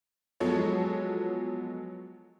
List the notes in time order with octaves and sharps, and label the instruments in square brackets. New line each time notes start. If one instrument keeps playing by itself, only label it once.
[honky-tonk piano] F3 F#3 G#3 B3 A4 C#5